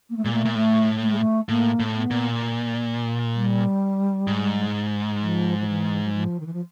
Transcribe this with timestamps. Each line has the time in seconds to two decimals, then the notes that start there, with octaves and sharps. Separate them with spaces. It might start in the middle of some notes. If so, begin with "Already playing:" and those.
0.10 A#3
0.16 A3
0.24 A#2 G#3
0.32 A3
0.45 A#2
0.55 A2 A3
1.02 A3
1.11 G#3
1.19 A3
1.49 A2 A#3
1.80 A2
1.95 B3
2.11 A#2
3.35 G3
4.27 G#2
5.21 F3
5.61 F3
5.68 E3
6.04 F#3
6.13 F3
6.40 D#3
6.46 E3
6.53 F3